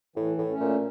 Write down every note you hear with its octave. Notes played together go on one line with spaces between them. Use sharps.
A2 E3
A2
A3 C#4
A#2